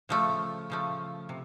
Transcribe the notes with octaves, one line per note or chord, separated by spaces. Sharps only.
C#3 F3 A3
C#3 F3 A3
C3